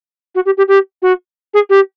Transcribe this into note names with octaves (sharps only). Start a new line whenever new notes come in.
F#4
G4
G4
G4
F#4
G#4
G4